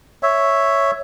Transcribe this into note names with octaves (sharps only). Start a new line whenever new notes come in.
C#5 E5